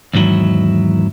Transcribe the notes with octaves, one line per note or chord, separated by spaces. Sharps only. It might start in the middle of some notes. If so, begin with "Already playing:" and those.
E2 G#2 D#3 F#3 E4